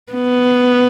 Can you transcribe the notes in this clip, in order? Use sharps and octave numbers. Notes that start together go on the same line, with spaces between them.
B3